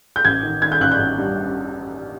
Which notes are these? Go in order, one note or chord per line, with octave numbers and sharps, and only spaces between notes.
G6
A1 G#6
D#3
D#3 G#6
G6
A1 F#6
G6
A1
G2